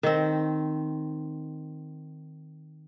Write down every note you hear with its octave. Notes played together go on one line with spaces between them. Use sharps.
D#3 C4